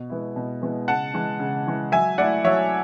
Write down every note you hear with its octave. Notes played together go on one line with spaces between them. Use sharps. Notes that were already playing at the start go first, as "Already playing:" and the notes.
Already playing: B2
G#3 B3 E4
B2
G#3 B3 E4
C#3 F#5 A5
E3 G#3
C#3
E3 G#3
F#3 E5 G#5
A3 E4 D5 F#5
F#3 C#5 E5